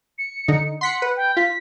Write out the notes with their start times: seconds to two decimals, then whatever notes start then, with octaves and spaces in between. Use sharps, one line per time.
0.18 C#7
0.48 D3 D#4
0.81 F#5 C6 B6 C#7
1.02 B4
1.16 G5
1.37 F4 B6